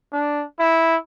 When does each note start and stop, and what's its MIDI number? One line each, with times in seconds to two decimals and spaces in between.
0.13 0.44 62
0.59 0.96 64